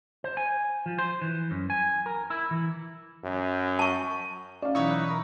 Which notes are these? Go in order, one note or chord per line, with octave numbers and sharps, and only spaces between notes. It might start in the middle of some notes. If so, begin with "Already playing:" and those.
C5
G#5
F3
C5
E3
F#2
G#5
A#4
E4
E3
F#2
A5 C#6
C#4 D5 F5
B2 E3 F#3 D#4 E4 B4 C#5 C#6
F#6
A#4